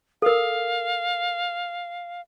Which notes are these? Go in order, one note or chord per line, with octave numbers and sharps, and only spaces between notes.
A4 A#4 F5